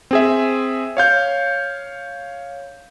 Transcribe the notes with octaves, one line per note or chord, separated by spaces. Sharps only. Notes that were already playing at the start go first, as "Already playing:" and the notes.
C4 G#4 E5
C#5 F5 G6